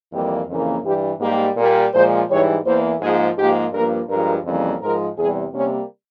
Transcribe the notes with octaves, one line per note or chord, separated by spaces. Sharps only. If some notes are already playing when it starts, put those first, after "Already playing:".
F2 E3 G3 A#3 G4
F2 C#3 E3 A#3
G2 E3 G3 G4
G#2 G3 A#3 G4
A#2 G3 A#3 A#4
A#2 F3 G#3 C5
G#2 E3 G3 C#5
E2 E3 A#3 C5
G#2 F3 A#3 G#4
G#2 F3 A#3 G4
G2 F3 A#3 A#4
G2 F3 G#3 A#4
F2 C#3 E3 G3 A#3
G#2 F3 G#3 A#4
E2 C3 G3 G#4
C3 G3 A#3 C#4